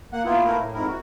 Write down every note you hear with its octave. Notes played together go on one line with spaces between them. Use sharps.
A#3 F#5
A#3 B3 E4 F4
A3 A#3 E4 A#4
A2
F2 G#2 E4 A#4
F#4